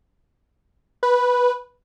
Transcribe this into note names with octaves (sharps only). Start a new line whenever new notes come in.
B4